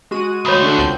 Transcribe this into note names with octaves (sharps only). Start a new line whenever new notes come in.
G#3 F#4 D#7
D2 C#5 B5 D#6
D4 F#4 A4
C#2 C4 G6